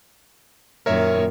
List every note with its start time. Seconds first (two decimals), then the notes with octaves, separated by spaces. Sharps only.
0.86 F#2 A#2 D#3 A#4 C#5 E5